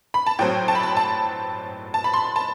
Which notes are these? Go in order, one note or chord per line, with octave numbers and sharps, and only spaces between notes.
B5
A5
A2 F#3 C4 G5
A5
B5
A5
A5
A5
B5
C6
A5